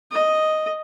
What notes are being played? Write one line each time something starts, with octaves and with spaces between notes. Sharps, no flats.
D#5